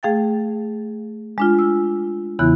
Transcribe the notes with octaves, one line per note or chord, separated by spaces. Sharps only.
A3 G#4 F5 G5 A6
G#3 D4 F4
E6
E2 C#3 E3 B3 E4 F#6